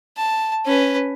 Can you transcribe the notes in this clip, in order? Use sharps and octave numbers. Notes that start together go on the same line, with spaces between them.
A5
C#4 B4